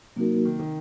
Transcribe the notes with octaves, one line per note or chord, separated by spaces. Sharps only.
C3 F#3 A#3 D#4 F#4 A#4
D#3
D#3